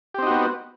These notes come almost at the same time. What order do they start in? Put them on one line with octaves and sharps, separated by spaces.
G4 C4 D#4 F#4 B3